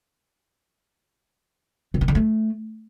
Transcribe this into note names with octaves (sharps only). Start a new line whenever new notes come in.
D3
D#3
D3
A3